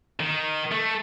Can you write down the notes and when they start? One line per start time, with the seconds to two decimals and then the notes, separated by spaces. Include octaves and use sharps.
0.20 D#3
0.72 A3